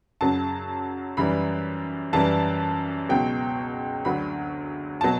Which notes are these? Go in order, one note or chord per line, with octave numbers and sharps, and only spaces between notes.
F#2 C#3 F#3 A5
F#2 E3 G3 B5
F#2 E3 G3 A5
C#2 B2 F#3 G5
D2 D3 F#3 B5
B2 F#3 A5